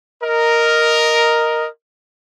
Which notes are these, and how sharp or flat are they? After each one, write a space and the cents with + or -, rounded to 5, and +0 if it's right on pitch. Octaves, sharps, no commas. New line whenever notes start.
A#4 +0 D#5 +0